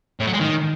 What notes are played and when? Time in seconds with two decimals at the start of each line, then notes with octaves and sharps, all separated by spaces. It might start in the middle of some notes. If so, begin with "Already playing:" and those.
0.20 A2
0.27 F#3
0.33 G#3
0.40 D#3